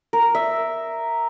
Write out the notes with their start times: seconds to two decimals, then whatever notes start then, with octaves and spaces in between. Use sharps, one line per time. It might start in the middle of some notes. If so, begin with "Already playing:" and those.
0.13 A#4
0.35 E5